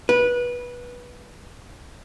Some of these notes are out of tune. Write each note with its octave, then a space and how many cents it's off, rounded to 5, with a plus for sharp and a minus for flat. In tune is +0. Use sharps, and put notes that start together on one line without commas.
B4 -20